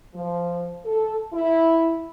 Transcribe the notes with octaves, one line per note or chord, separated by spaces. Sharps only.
F3
A4
E4